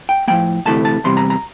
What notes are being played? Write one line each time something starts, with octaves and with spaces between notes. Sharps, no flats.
G5
A2 F3 A#3 G5
D2 C3 E3 A3 A5
A5
E2 C3 G3 C6
A#5
A#5